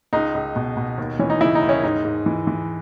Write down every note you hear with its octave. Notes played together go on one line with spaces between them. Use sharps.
C#2 D#4
C#2
B2
B2
D#2
E3 C#4
D#4
C#3 E4
D#4
D#2
C#4
G#2 D#4
G#2
E3
E3